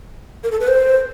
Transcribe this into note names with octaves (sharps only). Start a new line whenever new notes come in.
A#4
A4
B4
C5